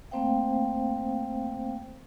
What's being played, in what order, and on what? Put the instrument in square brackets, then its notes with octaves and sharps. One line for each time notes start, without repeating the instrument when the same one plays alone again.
[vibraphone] A3 A#3 C4 C5 F5 G5